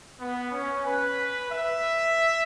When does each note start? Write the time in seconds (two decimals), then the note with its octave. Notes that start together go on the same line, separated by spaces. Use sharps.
0.19 B3
0.52 C#4
0.84 B4
1.50 E5